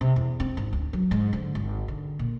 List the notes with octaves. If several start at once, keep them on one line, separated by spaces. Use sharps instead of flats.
C3
E2
C4
G#1
D2
F#3
G#2
D3
G#1
D3
A#2